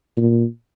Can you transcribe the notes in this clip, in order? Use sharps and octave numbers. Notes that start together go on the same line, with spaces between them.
A#2